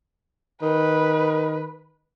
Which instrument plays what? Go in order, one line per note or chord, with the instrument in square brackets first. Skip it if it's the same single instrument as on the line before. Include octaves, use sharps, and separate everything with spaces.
[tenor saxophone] D#3 [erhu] B4